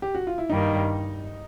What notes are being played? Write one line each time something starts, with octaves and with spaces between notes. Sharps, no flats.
G4
F#4
F4
E4
G2 D#3 G3 A#3 D#4